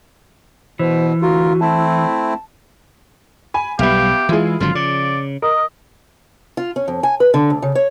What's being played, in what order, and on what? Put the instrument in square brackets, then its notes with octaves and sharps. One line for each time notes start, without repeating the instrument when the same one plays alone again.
[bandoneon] B2 [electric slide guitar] E3 [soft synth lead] C5
[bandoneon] D2 F4 A#4 [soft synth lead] F#4
[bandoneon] A3 C4 E4 [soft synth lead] A5
[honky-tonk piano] G#5 B5
[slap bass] B1 G3 [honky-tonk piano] B3 E5 F5 [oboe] G4
[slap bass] E3 G#3 [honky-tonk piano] E4 F4 G#4
[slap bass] G#1 D3 F#3 [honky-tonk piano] F3 [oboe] F4
[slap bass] C#3 [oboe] D5
[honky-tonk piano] A#4 [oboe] D#5
[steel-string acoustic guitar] F4
C#4
F2
G#5
B4
D3
D2
C#3
C#5